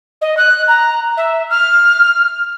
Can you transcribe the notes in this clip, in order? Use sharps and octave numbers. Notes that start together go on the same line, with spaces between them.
D#5
F#6
A#5
E5
F6